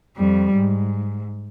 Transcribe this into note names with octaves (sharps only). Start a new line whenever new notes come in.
F2 G3
G#2